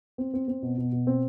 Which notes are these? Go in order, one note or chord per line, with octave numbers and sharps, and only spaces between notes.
C4
C4
C4
B2
B2
B2
C4